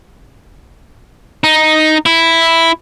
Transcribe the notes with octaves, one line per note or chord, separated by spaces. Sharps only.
D#4
E4